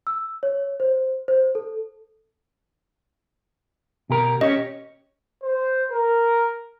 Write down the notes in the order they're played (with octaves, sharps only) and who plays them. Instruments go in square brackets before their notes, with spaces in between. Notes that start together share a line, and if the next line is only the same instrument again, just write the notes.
[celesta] E6
C#5
C5
C5
A4
[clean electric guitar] B2 G4 A#4
[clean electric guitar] C#4 G4 C#5 [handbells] D#5
[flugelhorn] C5
A#4